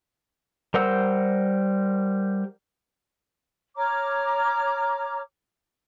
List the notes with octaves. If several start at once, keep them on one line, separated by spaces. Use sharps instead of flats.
G3 A#4 C5 F#5 E6
C#5 A#5 D6 F6